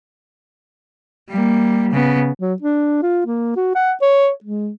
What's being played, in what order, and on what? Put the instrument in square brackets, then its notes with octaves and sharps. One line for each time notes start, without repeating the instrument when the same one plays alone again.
[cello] G3 A#3
C#3 B3
[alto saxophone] F#3
D4
F4
A#3
F#4
F#5
C#5
G#3